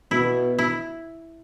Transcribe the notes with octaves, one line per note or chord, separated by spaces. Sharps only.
B2 E4
E4